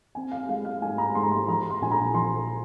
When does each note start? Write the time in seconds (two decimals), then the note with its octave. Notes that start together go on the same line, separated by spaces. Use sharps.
0.15 C4 G#5
0.31 F5
0.49 G#3 F5
0.65 F5
0.81 G#2 G#5
0.98 A#5
1.15 G#2 C6
1.23 A#5
1.32 C6
1.48 F3 A#5
1.70 C6
1.81 A#1 G#5
1.91 A#5
2.14 F3 C6